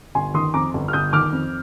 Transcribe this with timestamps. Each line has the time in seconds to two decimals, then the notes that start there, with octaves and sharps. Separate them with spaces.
0.15 G1 G#5 C6
0.34 D#3 C6 D#6
0.54 F2 A#5 D6
0.74 G1
0.88 F6
0.93 G1 D#6 G6
1.13 D#3 D6 F6
1.32 F2